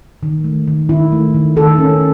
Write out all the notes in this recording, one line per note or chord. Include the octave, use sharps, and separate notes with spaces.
D#3
A3
D#3
D#3 E4
A3
D#3
D#3 A4
C#4